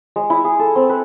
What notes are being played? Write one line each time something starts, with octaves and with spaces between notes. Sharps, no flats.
G#3
E4
G#4
A4
C4
B4